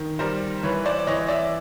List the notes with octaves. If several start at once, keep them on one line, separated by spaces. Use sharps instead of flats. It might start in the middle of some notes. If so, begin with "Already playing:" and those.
Already playing: D#3
G3 A#4 C5
E3 B4 C#5
C5 D5
E3 C#5 D#5
D5 E5